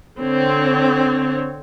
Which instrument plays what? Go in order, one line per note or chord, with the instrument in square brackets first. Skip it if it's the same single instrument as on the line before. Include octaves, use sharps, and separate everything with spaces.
[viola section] D3 C4 C#5